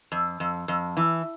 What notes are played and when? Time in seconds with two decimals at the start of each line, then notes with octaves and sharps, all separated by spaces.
0.12 F2
0.40 F2
0.68 F2
0.97 E3